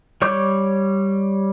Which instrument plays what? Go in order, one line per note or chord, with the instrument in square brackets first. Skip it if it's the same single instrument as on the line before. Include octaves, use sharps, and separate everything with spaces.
[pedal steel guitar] G3 C#5 C#6 D6 G6